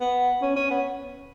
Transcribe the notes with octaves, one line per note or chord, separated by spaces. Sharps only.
B3
C#4
C#4
B3